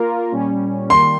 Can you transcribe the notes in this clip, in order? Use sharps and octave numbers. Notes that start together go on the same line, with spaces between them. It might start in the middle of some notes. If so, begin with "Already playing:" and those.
Already playing: A#3 F4 A#4
A#2 G3 C#4
D#3 G3 A#3 C6